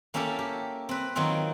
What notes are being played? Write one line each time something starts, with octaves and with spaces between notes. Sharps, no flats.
A#3 C#4 E4 G4 A4 A#4
G4
C4 B4
D#3 F#3 A#3 C4 F4